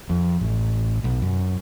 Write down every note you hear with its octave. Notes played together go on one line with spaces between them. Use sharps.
F2
A1
B1
F#2